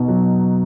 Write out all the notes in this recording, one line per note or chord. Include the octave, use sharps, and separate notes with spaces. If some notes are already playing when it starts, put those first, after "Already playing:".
Already playing: B2 D#4
F#3